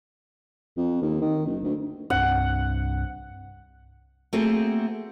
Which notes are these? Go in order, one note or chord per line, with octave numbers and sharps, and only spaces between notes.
F2
D#2
D#3
F#1
D2
C2 G2 C4 F#5
A3 A#3 C4 F#4 G#4 C5